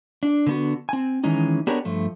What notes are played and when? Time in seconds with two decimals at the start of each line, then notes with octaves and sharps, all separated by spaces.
0.23 D4
0.47 D3 B3 F#4
0.89 C4 G#5
1.24 D#3 E3 G#3 C#4 D#4
1.67 B3 D4 G4 G#4 A#4 C#5
1.85 G2 F3 A3